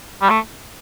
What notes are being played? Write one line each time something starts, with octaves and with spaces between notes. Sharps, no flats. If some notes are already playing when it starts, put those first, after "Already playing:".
G3
A3